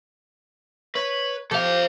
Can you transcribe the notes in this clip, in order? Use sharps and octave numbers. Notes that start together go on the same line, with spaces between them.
B4 C#5
F3 G4 A4 F5